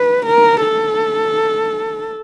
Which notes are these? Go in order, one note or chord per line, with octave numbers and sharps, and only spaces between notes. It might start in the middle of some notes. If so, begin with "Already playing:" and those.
Already playing: B4
A#4
A4